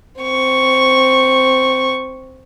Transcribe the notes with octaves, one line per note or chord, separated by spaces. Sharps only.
C4 C#6